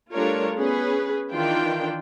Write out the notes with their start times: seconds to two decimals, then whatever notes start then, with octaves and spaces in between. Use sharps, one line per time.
0.13 G3 A3 D4 F4 A#4 C#5
0.56 B3 C#4 G#4 B4
1.31 D#3 E3 D4 F4 G5